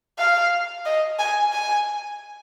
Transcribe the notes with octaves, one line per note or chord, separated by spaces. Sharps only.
F5
D#5
G#5
G#5